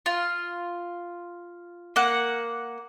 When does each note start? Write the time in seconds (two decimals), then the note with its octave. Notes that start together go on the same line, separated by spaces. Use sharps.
0.06 F4
1.96 A#3 F#5